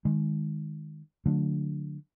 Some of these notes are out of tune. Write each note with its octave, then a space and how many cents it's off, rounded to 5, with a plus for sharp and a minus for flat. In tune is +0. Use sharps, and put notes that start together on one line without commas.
D#3 -10 G#3 +0
D3 +0 F#3 -40 A3 +0